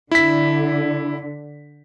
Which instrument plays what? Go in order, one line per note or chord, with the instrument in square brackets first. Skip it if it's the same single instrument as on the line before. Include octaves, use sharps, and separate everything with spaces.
[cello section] D3 [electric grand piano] E4 B6